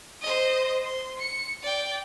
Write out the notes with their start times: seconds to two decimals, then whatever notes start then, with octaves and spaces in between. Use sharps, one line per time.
0.22 C5 D#5
0.84 C6
1.19 C#7
1.63 D5 G5